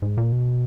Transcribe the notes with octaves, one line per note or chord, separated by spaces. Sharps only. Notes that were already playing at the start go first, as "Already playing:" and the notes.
G#2
A#2
B2